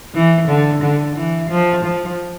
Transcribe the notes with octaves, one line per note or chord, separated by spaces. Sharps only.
E3
D3
D3
E3
F3
F3